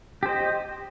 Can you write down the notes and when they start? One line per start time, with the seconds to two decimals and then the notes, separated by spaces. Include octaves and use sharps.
0.23 G4
0.26 C5
0.29 D#5